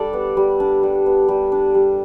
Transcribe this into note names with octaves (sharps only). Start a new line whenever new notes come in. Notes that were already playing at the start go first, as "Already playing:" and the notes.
Already playing: G3 D4 A4 D5
B3
G3
D4
G3
B3
G3
D4
G3